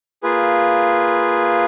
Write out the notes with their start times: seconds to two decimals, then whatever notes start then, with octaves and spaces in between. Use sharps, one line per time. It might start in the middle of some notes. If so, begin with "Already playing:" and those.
0.23 A#3 F4 G#4 B4